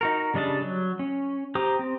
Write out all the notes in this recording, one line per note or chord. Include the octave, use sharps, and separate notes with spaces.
D#4 F#4 A#4
C#3 G3 D4 D#5 A5
F#3
C#4
G4 C5 A#5 D#6
C4